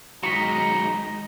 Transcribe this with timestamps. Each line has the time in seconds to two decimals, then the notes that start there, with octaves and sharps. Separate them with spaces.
0.23 D#3 F#3 G#3 D#4 A#5 C#6 B6